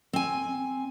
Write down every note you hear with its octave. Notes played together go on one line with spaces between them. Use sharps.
C4 G#5